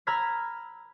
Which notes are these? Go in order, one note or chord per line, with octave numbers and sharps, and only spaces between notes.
A#5 B5 E6 F6 G#6 B6